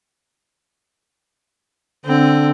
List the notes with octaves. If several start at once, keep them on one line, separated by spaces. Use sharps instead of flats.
D3 C4